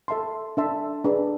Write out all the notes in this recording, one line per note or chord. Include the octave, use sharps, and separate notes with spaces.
A4 E5 A5 C6
D4 A4 E5 A5 C6
D4 G#4 B4 D5